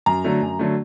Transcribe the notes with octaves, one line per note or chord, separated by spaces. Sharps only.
F#2 A#5
D3 F#3 A3
F#2
D3 F#3 A3